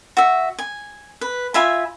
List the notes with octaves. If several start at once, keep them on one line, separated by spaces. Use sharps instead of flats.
F#4 E5
G#5
B4
F4 E5 G#5 B5